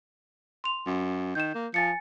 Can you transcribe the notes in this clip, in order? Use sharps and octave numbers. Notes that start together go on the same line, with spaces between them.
C6 F7
F#2
D#3 G6 E7
A#3
F3 G#5 A6 C#7